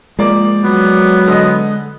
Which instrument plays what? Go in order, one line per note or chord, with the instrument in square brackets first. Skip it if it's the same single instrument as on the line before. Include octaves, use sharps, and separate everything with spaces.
[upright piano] F3 A#3 D5 [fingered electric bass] G#3
[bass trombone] F#3 [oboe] B3
[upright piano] D3 D#5 D#6